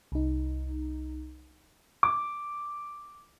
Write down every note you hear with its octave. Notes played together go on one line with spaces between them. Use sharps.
C2 D#4
D6